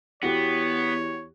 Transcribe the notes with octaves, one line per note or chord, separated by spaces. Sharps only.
E2 B3 F#4 G4 C#5